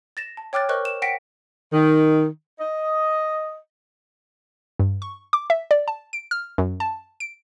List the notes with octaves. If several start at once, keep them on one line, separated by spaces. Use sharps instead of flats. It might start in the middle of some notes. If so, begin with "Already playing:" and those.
A6 A#6 E7
A5
C#5 G5 D6 F6 F#6 A6
A#4 C5 D#5 C#6 F6 F#6
E7
F#5 G5 A#6 B6 C#7 D7
D#3
D#5
G2
C#6
D6
E5
D5
A5
D7
F6
F#2
A5
D7